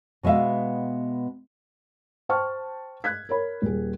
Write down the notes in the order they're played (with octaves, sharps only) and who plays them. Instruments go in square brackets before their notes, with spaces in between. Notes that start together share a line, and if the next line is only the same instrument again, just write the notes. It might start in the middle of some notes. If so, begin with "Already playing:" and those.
[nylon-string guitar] B2 G#3 B3 E5 F5
[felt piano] C5 G5 A5 C#6 F6
F#6 G#6 B6
A#4 C#5 B5
D#1 G#4